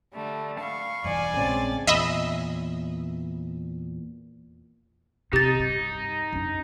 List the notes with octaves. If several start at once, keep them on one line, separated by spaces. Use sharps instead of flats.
D3 G3 A3
F5 B5 C#6
E1 G2 E3 D5 G#5
A#1 A2 C#3 G#3 C4 D4 A6
E2 A#2 D#5 E5 B5
C3 D#4 G4 A6
G2
F#2 D4